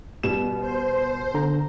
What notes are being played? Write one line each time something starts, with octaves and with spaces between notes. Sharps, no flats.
B2 G3 E7
C5
D3 A#5